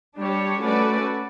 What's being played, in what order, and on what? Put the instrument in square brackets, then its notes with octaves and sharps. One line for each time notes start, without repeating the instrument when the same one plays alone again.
[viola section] G3 D4 G4 C#5
A3 C#4 F#4 B4 D5